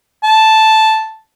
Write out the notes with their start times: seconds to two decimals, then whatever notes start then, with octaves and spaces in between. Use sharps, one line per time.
0.23 A5